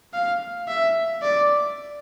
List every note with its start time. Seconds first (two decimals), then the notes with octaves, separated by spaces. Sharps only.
0.14 F5
0.68 E5
1.22 D5